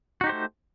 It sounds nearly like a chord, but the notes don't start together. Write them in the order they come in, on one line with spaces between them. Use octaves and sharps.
F#4 D#4 G4 C5 A3